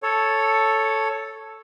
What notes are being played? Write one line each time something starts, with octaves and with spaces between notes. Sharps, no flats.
A4 C#5